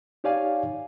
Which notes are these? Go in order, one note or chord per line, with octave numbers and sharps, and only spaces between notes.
D#4 G4 C#5 D5 F5 G#5